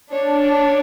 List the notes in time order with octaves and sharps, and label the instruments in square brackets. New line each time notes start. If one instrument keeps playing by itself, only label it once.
[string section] D4 [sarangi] C#5